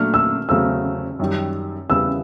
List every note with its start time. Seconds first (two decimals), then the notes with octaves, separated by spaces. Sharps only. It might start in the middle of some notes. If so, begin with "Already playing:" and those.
Already playing: A#2 F#3 A3 D4 F6
0.14 E6
0.49 E2 C#3 F#3 A3 C4 E6
1.19 F#2 D#3 G3
1.89 E2 C#3 E3 G3 B3 E6